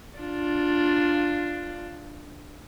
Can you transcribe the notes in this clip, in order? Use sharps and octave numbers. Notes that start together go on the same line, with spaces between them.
D4 F4